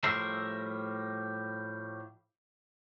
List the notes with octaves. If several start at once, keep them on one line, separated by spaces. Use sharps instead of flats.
A2 F3 G3 A#4 E5 C6